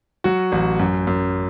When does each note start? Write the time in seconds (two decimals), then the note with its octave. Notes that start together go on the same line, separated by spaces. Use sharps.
0.24 F#3 F#4
0.52 A1
0.79 F#2
1.07 F#2